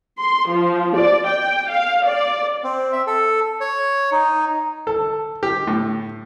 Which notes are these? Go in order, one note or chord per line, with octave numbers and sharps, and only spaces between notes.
C6
F3
D5
G5
F5
D5
C4
E5
A4
C#5
D#4
A4
G4
A2